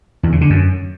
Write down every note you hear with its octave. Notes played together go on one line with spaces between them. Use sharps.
E2
C#3
D3
F#2